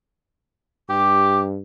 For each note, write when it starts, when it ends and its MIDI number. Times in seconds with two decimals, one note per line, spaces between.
0.90 1.61 43
0.90 1.45 67
0.90 1.40 86